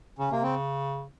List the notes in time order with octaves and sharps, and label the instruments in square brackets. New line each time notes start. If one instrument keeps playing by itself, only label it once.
[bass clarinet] C#3 [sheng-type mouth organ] C#4
[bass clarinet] C3 [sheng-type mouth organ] A#3
[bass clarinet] C#3 [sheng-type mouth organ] C4